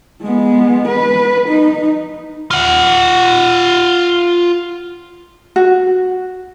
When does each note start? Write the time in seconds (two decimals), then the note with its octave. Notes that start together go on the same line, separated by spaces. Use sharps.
0.22 G#3 B3
0.88 B4
1.49 D#4
2.51 F4 F#5
5.56 F#4